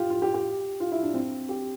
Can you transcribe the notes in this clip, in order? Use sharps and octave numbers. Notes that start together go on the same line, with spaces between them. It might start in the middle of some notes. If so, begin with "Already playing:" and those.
Already playing: F4 G4
F4
G4
G4
F4
E4
D4
C4
G4